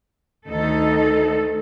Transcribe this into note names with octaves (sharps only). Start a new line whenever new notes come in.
D2 D#3 D#4 A4